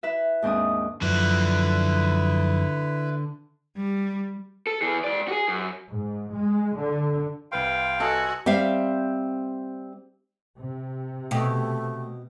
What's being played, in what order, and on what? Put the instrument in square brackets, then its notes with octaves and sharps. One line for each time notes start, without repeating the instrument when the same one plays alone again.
[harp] E4 B4 E5
D#2 G#2 C4 D4 D#6
[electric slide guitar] F#2 F3 [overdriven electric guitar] D3 F#4 [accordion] E4 B4
[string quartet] G3
[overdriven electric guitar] A4
E3 G#4
G#2 D5
F#4 G#4
F#2
[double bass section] G#2
G#3
D3
[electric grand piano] C2 B4 C6 [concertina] F5 G5
[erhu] F#4 [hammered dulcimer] A4 D#5 G#5
[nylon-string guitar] G3 C4 E5 F5
[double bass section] C3
[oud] B2 G4 [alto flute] A3